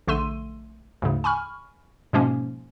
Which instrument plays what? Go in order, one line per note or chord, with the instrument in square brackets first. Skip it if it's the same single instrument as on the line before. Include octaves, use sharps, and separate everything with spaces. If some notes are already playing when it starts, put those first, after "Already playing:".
[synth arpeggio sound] A#1 D3 A3 C6 E6 D#7
D2 G#2 C#3
G#5 B5 C#6 F6
G#2 B2 F3 G#3 A#3 C#4